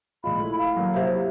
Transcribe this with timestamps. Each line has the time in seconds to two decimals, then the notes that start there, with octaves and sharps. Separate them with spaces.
0.24 A#1 G#3 F4 B5
0.39 A3 E4
0.58 F5
0.77 F#3 A#3
0.94 C3 E4